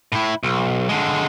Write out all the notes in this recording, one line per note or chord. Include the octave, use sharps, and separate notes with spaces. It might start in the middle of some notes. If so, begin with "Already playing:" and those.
A2 E4
B1
D3 G#3